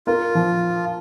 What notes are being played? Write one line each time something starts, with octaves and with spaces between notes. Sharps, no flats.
F4 A#4
F3